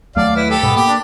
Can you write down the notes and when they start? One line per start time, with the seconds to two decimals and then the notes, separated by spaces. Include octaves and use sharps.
0.16 D#2 F#3 A3 D5 F5
0.36 E4 B4
0.51 G4 A4
0.63 G#2 B2 G#3 B3
0.76 A#3 G4
0.88 D4